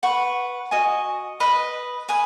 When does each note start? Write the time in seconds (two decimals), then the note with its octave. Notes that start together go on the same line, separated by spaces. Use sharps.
0.03 B4 F#5 C#6
0.71 F#4 D#5 G#5
1.40 B4 D#5 B5
2.09 B4 G#5 D#6